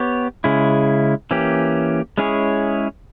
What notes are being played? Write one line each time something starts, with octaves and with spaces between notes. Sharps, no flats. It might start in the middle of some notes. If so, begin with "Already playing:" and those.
Already playing: B3 G4 C#5
C#3 G#3 C#4 E4
E3 A#3 C#4 G4
G#3 C#4 E4 G#4 C#5